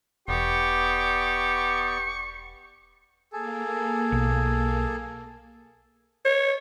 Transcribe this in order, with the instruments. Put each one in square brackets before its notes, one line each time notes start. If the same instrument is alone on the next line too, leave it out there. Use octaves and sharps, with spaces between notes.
[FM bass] E1 [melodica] B3 D5 [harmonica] G4 [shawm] C#6
[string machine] A#3 [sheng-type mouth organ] G#4 A4
[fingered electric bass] B1
[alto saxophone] C#5